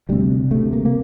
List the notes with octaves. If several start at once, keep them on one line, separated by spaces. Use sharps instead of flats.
D2 C3 G3
D2 C3 A3
A#3
A#3